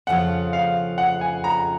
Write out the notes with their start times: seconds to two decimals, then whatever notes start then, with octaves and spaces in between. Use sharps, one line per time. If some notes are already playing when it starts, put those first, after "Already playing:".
0.07 F2 C#3 F3 F#5
0.53 F5
0.98 F#5
1.21 G#5
1.44 A#5